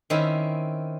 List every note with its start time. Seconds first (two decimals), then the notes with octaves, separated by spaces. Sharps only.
0.10 D#3 C4 C#4 E4